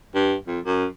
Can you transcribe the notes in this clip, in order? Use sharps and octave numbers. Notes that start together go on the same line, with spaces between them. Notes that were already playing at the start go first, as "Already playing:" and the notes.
G2
F2
F#2